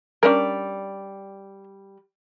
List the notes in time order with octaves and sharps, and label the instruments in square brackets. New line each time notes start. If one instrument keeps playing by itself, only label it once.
[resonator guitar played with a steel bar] G3 D5 [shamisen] C#4 D4 A#4